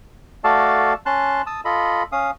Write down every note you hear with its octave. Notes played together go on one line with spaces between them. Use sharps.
A3 F#4 A4 D5 F5 A5
C#4 A5 C6 F#6
A5 D#6 E6
F4 A4 D#5 B5
C#4 F5 D#6